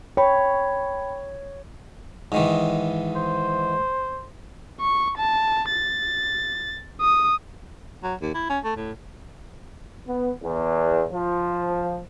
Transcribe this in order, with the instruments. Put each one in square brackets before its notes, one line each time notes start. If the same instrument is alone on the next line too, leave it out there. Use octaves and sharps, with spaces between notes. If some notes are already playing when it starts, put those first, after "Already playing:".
[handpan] C#5 [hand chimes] G5 B5
[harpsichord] G#2 D#3 E3
[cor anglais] C5
[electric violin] C#6
A5
A6
D#6
[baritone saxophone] F#3
D#2
E4
C#4
A3
A2
[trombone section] B3
E2
F3